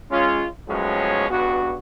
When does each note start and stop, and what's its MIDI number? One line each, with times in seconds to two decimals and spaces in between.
0.10 0.45 56
0.10 0.45 61
0.10 0.45 65
0.67 1.28 45
0.67 1.28 53
0.67 1.28 54
0.67 1.28 56
0.67 1.28 59
0.67 1.28 61
1.29 1.77 37
1.29 1.77 43
1.29 1.77 59
1.29 1.77 66